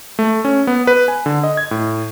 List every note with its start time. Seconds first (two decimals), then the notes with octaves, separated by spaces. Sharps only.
0.19 A3
0.45 C#4
0.67 B3
0.87 B4
1.08 G#5
1.26 D3
1.44 D#5
1.57 G#6
1.71 A2